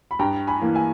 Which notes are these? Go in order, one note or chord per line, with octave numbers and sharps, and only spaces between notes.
B5
G2 G5 A#5
G#5 B5
E3 A#3
E5 G#5